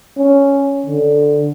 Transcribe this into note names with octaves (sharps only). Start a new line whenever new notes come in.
C#4
D3